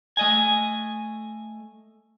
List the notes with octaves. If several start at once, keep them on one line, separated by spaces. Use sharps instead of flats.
A3 D#5 G#5